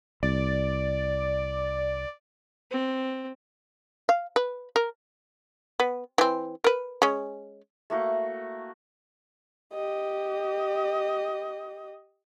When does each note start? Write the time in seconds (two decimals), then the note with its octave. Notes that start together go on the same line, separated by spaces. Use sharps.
0.23 C2 D5
2.71 C4
4.09 F5
4.36 B4
4.76 A#4
5.80 B3
6.18 E3 C4
6.64 A#4 B4
7.02 G#3 C#4
7.90 A3 A#3 F#4
9.73 G4 D#5